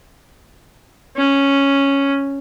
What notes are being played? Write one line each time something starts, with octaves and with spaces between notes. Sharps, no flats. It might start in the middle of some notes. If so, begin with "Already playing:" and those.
C#4